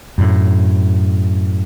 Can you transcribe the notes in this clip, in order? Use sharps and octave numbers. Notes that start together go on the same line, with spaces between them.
F#2 A2